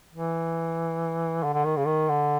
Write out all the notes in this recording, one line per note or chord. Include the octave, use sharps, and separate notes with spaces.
E3
D3
D3
D#3
C#3
D#3
D3